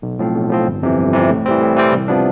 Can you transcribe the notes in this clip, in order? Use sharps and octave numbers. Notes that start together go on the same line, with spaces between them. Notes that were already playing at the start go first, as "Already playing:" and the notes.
B1
A2 F3 C4
B1
A2 F3 C4
G1
F2 C3 E3
G1
F2 C3 E3
A2
E3 G3 C4
A2
E3 G3 C4
C2
C3 F3 B3 D4